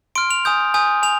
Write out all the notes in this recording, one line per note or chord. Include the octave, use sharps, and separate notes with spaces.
C6 F6 D7
F7
G#5 D#6 G6
G#5 D#6 G6
G#5 F7